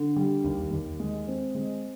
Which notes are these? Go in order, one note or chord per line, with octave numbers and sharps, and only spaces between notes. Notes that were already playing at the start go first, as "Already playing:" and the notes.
Already playing: D3
G3
D#2
D#2
G#3
C4
G#3